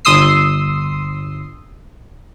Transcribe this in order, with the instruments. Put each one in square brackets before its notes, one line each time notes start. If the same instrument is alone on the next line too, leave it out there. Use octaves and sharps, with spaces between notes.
[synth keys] G1 C6 D#6 E6 C7